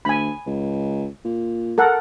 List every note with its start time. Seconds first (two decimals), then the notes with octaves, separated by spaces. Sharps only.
0.05 D2 G#5 B5
0.46 C#2
1.25 A#2
1.78 A4 A#4 F#5